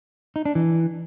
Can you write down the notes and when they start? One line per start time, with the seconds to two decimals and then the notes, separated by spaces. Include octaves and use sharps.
0.36 D#4
0.45 D4
0.55 E3